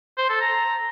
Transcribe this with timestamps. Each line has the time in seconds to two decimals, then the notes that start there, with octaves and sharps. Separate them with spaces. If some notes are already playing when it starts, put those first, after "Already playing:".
0.18 C5
0.29 A4
0.41 A#5